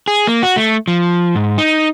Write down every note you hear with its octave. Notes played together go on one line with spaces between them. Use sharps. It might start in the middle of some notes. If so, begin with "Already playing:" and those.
G#4
A#3
F#4
A3
F3
G#2
D#4